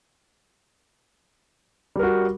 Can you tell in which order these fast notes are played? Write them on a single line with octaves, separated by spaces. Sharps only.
G3 A#4 F#4